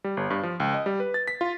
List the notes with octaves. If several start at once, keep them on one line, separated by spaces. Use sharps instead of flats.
G3
G1
G2
F3
C#2
D#5
G3
B4
A6
B6
F4